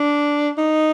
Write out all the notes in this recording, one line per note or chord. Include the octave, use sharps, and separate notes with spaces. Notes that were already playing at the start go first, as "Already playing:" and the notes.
Already playing: D4
D#4